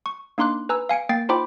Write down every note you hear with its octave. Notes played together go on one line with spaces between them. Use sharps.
C#6
A#3 D4 D#4 C6 D6 F#6
B4 G#5 A#5 E6
F5 G#5 C#7 D7
A#3 G5 A6 C7
D#4 F4 C5 G5 B5 D6